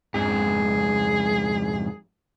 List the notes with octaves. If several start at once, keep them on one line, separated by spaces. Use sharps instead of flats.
F2 G#2 G#4